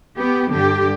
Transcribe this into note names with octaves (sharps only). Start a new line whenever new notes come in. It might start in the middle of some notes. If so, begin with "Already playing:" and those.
B3 G4
G2 D3 G4